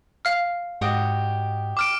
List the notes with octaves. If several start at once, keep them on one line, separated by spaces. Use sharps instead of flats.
F5 F6
G#2 F#4 G4 D#5
D6 F6 D7